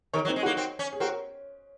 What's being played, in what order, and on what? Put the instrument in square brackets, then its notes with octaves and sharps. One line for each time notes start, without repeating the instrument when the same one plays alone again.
[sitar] D#3 [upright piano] A#4 C#5
[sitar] F#3
[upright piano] C4 D#4
[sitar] G#3
[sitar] A#3 [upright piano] D#4 F#4
[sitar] C4
C#4
[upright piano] G#4
[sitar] C4 [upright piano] F#4 A#4